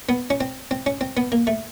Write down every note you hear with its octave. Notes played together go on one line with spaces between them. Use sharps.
B3
C#4
C4
C4
C#4
C4
B3
A#3
A3